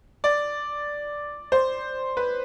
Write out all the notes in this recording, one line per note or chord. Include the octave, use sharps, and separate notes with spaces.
D5
C5
B4